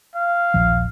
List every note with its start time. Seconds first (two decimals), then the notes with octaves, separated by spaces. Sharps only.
0.15 F5
0.54 D#1 A#1 F3